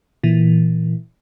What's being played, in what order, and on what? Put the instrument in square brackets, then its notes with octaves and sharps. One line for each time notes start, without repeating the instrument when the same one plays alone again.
[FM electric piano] A#2 E3